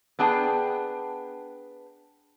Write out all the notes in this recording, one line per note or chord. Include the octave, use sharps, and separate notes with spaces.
B3 D4 G#4 G5 A5